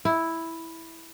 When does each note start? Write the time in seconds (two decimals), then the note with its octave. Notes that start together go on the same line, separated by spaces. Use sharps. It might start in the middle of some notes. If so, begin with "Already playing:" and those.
0.05 E4